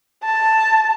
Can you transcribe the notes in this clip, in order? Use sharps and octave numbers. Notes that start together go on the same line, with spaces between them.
A5